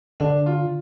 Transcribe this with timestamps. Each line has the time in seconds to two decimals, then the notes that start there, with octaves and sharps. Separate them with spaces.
0.20 D3 D4
0.46 F4